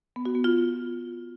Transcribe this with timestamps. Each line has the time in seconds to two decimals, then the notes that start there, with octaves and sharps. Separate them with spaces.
0.16 B3
0.26 F#4
0.35 B3
0.44 F4